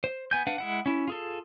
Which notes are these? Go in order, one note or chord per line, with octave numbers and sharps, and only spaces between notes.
C5
B3 G#5 G6
D4 B4 F5 F#5
G#3 E4 F#5
C#4 E4
F4 G#4 A4